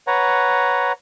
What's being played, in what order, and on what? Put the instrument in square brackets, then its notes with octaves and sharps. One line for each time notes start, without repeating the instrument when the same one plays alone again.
[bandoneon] B4 C#5 F#5 A#5